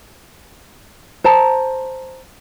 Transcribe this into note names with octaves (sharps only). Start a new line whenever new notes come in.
C5 A5 A#5